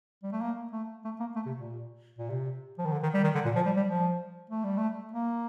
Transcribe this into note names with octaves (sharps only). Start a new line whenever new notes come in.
G3
A3
A#3
A3
A3
A#3
A3
C3
A#2
A#2
C3
F3
D#3
D3
D#3
G3
D#3
D3
A#2
F3
G3
G3
F3
A3
G3
A3
A#3